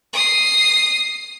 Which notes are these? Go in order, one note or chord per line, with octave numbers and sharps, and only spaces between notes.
D#6 C7